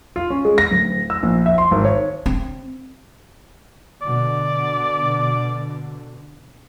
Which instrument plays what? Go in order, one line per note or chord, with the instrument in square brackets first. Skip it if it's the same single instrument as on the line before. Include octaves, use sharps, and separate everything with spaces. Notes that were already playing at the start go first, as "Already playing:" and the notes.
[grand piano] F4
C#4
G#3
A#6
D1
E6
A#1
E5
C6
G#1
C#5
[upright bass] C4
[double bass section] B2 D3 [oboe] D5